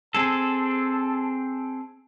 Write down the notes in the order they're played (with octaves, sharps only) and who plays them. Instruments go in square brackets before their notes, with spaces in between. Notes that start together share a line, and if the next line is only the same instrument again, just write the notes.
[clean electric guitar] C4 G#4 A4 [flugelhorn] A5